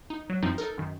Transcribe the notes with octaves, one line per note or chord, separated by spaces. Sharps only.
D#4
F#3
F#2 F3 C4 D#4
D#4 A4 A#4
F#2 D#3